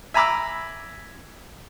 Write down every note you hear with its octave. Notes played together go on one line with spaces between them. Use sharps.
E5 G#5 A#5 B5 D6 E6